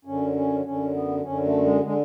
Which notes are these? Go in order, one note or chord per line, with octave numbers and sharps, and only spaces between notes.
F#2 D3 C#4
C#4
F#2 D3 C#4
B3
F#2 D3 C#4
A3
G#3
D3 G#3